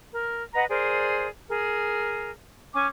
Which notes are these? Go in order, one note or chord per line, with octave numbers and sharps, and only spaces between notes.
A#4
B4 D#5 F#5 A#5
G#4 A#4 C5 D5
G#4 A#4
C#4 G#5 C#6 D6